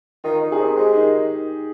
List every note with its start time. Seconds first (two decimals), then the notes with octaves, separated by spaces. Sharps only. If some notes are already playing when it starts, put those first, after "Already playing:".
0.24 D#3 F4
0.42 D#3
0.52 G#4
0.60 C4 G4
0.77 G#3 G4
0.94 D#3 D#4